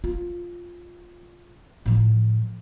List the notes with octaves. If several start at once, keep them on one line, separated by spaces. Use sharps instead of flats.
F4
A2 F3